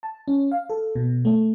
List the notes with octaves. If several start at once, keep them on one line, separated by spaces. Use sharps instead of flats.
A5
C#4
F5
A4
B2
A3